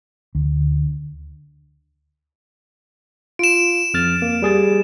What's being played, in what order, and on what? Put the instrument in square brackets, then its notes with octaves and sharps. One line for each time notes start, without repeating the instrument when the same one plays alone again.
[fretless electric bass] D2
[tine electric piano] F4 [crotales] D7 E7
[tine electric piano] F2 F6 A6
A#3
G3 G#4 A6